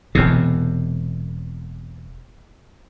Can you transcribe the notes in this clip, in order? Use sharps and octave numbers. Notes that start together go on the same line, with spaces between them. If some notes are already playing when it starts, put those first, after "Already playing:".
E1 E2 C3